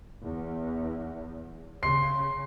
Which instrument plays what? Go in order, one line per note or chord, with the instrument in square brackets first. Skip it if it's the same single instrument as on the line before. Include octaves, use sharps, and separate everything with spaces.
[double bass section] E2
[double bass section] C#3 [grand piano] C6 C7